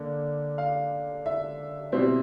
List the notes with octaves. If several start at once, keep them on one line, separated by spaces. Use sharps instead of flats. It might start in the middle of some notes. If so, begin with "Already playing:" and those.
Already playing: D3 A#3
F5
E5
B2 G3 C4 E4